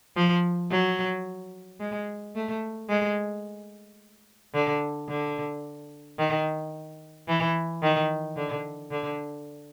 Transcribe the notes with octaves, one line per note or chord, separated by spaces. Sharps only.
F3
F#3
G#3
A3
G#3
D3
D3
D#3
E3
D#3
D3
D3